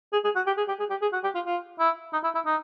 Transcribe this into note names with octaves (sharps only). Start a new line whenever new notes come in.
G#4
G#4
F#4
G4
G#4
G4
G#4
G4
G#4
F#4
G4
F4
F4
E4
D#4
E4
E4
D#4